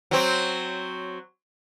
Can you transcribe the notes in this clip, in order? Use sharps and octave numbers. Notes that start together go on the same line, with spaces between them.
F#3 C4